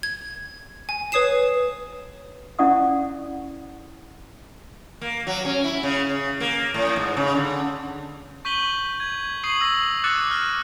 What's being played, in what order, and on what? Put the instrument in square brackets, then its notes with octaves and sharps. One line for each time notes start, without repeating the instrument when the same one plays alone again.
[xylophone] G#6
G#5
B4 C#5 D#6 C7 E7
[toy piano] C#4 E4 D5 F#5 C#6 D#6
[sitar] A#3
F#3
C#4
E4
C#3
C#3
A#3
A2
G#2
C#3
D3
[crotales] C#6 G6 B6 D#7 F#7 G7
G#6
C#6 D#6 C7 D#7 F#7
E6 A#6 F#7
D6 E6 F#6 A6 C#7
F6 F#6